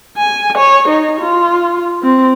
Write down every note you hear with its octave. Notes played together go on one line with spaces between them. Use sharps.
G#5
C#5
D#4
F4
C4